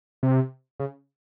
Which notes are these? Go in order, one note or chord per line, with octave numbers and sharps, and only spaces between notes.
C3
C#3